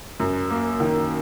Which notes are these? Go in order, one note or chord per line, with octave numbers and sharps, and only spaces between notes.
F#2
A#3
D#3